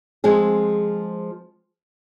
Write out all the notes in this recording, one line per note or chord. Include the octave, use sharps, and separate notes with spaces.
F3 G#3 C4 G#4